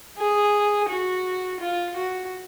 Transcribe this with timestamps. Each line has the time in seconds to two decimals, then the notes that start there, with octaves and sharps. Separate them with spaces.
0.18 G#4
0.89 F#4
1.60 F4
1.96 F#4